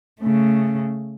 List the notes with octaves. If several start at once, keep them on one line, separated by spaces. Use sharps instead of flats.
C#3 A3